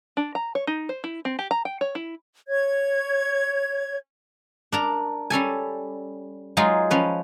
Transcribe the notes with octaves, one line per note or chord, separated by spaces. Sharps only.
D4
A#5
C#5
D#4
C5
E4
C4
G4
A#5
G5
C#5
E4
C#5 G#6
D4 A#4 A#5
G3 C#4 A4 G#5
F#3 G#3 D#4 F4 G#4
F3 C#4 B4